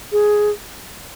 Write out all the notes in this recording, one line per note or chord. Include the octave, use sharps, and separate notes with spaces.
G#4